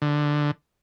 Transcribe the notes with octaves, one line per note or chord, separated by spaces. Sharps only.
D3